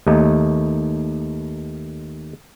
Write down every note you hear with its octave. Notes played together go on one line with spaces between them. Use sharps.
D#2 A3 D#4